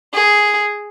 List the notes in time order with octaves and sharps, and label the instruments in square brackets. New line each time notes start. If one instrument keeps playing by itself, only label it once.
[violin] G#4